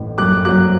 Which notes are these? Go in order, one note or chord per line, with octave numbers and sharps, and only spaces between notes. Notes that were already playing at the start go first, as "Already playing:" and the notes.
Already playing: A1 A2
F#2 D6 F#6
F#3 D6 F#6